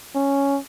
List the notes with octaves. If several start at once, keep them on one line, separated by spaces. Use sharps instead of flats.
C#4